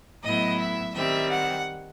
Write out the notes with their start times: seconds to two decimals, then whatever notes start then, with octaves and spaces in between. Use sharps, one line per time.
0.23 A2 F#3 B3 E4 D#5
0.58 E5
0.93 D#3 G3 C4 E5
1.29 F#5